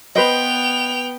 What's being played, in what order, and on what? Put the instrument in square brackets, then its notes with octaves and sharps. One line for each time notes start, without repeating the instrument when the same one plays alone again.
[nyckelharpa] B3 [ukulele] B4 C5 D#5 [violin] G5 F7